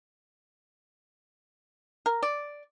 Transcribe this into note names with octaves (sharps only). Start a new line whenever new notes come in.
A#4
D5